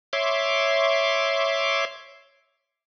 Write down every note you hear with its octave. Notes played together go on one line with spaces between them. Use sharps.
C#5 E5 C6 D6